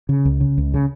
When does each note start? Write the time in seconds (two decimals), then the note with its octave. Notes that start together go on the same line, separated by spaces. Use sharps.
0.09 C#3
0.25 C#2
0.41 C#3
0.58 C#2
0.74 C#3